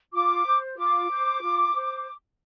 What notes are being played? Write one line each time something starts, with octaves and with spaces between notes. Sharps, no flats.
F4 D6
C5
F4 D6
C5
F4
C5